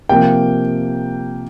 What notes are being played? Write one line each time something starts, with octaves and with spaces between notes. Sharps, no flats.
C3 F3 A#3 G5